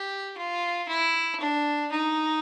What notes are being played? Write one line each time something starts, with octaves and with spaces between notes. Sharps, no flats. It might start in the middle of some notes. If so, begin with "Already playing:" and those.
Already playing: G4
F4
E4
D4
D#4